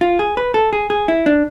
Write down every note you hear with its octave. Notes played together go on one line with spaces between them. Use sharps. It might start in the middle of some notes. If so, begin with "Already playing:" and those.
F4
G#4
B4
A4
G#4
G#4
E4
D4